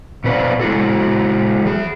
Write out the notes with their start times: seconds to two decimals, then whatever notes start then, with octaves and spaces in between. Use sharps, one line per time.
0.24 B2 C#4 B4 C5 D5 F5
0.60 G#3 E4 F#4 A4
1.65 E3 G#4